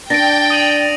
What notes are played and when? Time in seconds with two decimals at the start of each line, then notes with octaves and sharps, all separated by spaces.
0.10 D4 G5 A6 A#6 D7
0.50 D#6 D#7 F#7